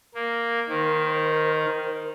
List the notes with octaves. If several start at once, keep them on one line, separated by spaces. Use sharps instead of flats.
A#3
D#3 A#4 C5